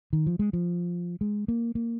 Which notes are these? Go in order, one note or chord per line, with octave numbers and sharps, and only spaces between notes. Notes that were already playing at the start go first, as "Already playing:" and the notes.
D#3
F3
G#3
F3
G#3
A#3
A#3